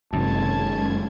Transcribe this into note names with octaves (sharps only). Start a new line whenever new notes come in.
F#1 F#2 C3 D#3 G#3 C#4 A5 G#6